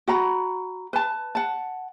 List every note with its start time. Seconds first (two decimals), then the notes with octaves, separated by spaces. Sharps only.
0.08 F#4 F#5 A#5 B5
0.93 B4 A5
1.35 F#5 A5